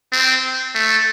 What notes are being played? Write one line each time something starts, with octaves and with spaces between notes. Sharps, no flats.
C4
A3